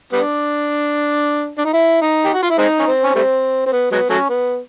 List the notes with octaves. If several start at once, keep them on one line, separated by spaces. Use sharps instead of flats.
G3 B3 D4
D4
D#4
E4
D#4
G4
F#4
F4
E4
G#3 C4 D#4
C#4
C4
C#4
G3 A3 C4
C4
B3
F#3 G#3 B3
F#3 A3 C#4
B3